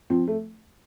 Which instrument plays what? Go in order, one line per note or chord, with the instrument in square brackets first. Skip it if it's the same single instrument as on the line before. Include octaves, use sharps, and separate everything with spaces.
[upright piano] F3 C4
A3